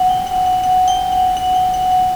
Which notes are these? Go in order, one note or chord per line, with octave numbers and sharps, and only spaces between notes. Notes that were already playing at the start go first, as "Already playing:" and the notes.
Already playing: F#5
G5
F#5
F#5
F#5
G5
F#5
F#5
G5
F#5
F#5